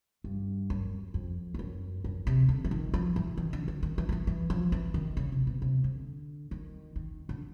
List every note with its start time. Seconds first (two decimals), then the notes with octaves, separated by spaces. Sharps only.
0.24 G2
0.70 F#2
1.14 F2
1.54 G2
1.59 F#2
2.04 F#2
2.27 C3
2.49 D3
2.64 E3
2.71 D#3
2.94 F3
3.16 E3
3.37 D#3
3.53 D3
3.68 D3
3.83 D#3
3.98 E3
4.09 D#3
4.12 E3
4.27 E3
4.50 F3
4.72 E3
4.94 D#3
5.17 C#3
5.32 C3
5.47 B2
5.62 C3
5.84 D3
6.51 D#3
6.96 D#3
7.29 D3